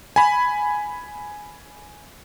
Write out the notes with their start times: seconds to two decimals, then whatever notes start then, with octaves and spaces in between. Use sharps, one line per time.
0.16 G#5 B5